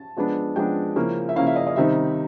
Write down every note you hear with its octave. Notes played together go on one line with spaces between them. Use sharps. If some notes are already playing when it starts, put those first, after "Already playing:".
Already playing: A5
F3 G#3 B3 D4
F3 G#3 B3 D4 G5
C#3 F3 A#3 C#4 E4
E5
C#3 F3 A#3 C#4 E4 F5
E5
D#5
D#5
C3 D#3 G3 C4 D#4 E5